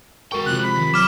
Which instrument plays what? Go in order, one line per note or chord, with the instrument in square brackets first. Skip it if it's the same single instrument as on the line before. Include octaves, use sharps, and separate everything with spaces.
[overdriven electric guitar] G#3 G5 [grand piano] F#4 A#4 C#6
[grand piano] C3 F3 [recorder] F#6
[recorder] B5
[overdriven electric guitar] D#3
[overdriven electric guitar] F#3 [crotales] D6 F6 E7